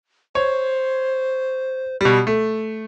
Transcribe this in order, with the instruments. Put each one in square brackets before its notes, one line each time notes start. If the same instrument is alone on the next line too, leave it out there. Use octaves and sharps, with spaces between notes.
[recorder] C5 [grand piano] C#5
[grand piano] B2 G3
A3